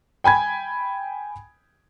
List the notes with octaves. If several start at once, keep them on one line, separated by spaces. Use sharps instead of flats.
G5 G#5 B5 G#6